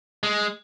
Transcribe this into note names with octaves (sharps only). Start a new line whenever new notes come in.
G#3